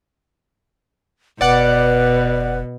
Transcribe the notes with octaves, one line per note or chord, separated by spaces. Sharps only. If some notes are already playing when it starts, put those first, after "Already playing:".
F1 B2 B4 D5 F#5